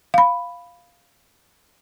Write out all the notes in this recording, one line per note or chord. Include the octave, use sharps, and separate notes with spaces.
F5 B5